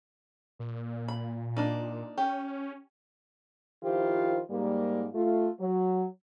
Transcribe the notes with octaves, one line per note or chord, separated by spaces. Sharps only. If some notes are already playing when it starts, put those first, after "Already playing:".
A#2
B5
A#3 D4 D#4
C#4 G4
D#3 F3 E4 F4 G4 C5
G#2 G3 A#3
A3 F4
F#3